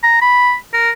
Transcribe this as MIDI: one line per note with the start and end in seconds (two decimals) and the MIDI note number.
0.03 0.21 82
0.22 0.55 83
0.74 0.91 70